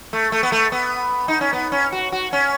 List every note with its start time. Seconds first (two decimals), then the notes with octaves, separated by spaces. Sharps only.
0.13 A3
0.32 A3
0.43 B3
0.52 A3
0.72 B3
1.28 D#4
1.41 C#4
1.53 B3
1.72 C#4
1.92 F#4
2.12 F#4
2.33 C#4